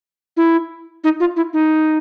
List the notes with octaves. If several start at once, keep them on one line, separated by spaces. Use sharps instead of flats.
E4
D#4
F4
E4
D#4